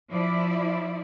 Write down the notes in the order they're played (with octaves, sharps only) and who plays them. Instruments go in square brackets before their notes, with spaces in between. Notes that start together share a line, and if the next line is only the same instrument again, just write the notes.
[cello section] F3 E4 D5